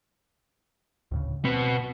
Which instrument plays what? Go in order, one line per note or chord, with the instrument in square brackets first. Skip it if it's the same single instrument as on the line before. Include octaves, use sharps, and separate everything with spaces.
[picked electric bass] D2 A2 C#3
[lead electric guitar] B2 B3 [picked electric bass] C4